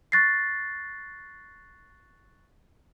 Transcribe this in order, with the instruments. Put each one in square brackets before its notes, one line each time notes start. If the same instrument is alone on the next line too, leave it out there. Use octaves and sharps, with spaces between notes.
[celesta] C#6 F#6 A6 A#6 C7